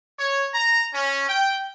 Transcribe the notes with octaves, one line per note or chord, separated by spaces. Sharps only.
C#5
A#5
C#4
G5